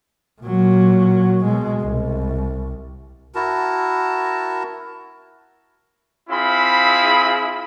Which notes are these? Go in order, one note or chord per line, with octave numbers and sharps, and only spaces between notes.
A#2 F#3
B2 G#3
C2
E4 F#4 A#4 A5
C4 E4 F4 G#4 B5